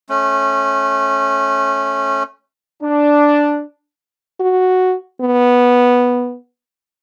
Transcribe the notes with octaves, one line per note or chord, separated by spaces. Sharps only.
A3 C#4
D4
F#4
B3